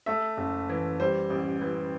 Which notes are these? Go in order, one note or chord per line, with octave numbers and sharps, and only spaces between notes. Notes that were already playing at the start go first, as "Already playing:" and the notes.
A3 E5
F#1
E3
G3 C5
A1
E3